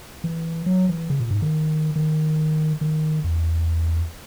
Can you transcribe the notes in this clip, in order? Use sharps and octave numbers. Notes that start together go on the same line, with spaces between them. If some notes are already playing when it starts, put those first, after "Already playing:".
E3
F#3
E3
C#3
A#2
G#2
D#3
D#3
D#3
E2